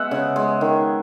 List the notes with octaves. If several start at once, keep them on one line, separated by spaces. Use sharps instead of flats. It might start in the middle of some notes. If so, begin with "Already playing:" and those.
Already playing: G#3 B3 E5 F#5
C#3
G#3
D#3